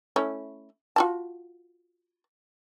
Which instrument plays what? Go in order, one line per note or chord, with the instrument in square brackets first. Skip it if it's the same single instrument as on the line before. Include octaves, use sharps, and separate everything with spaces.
[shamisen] A3 C#4 E4
F4 F#4 A5